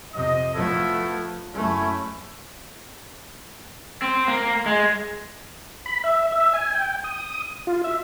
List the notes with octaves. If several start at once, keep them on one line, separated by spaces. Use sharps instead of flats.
F2 C3 D#5
F3 A3 B3 E4 A4
F#1 A3 C#4 E4
C4
A#3
G#3
B5
E5
E5
G#5
G5
D#6
F4
E5